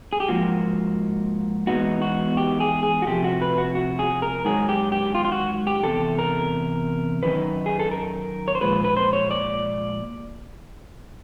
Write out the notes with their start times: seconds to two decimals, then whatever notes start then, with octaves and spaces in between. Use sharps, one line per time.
0.13 G#4
0.20 G4
0.28 G#2 F3 A#3 F4 F#4
1.67 E2 B2 G#3 B3 D#4 F#4
2.02 F#4
2.37 G4
2.60 G#4
2.83 G#4
3.02 F#4
3.07 C3 F3 A3 G4
3.24 F#4
3.41 B4
3.58 F#4
3.75 F#4
3.99 G#4
4.22 A#4
4.45 G#2 D#3 F#3 G#4
4.69 G4
4.92 G4
5.15 F4
5.25 F4
5.32 F#4
5.67 G4
5.83 E2 C3 A4
6.19 A#4
7.23 F#2 D#3 D#4 B4
7.66 G#4
7.79 A4
7.91 A#4
8.48 C#5
8.55 C5
8.61 A#2 F3 G#3 B4
8.84 B4
8.97 C5
9.13 C#5
9.31 D5